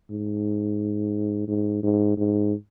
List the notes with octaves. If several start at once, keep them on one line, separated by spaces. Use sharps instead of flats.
G#2
G#2
G#2
G#2